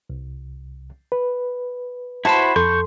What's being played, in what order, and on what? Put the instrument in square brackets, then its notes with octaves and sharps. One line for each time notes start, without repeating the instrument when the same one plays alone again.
[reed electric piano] C2
B4
[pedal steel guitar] E4 F#4 C5 [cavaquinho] A5 B5
[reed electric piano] F2 A4 C6 [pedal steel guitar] C#6 G6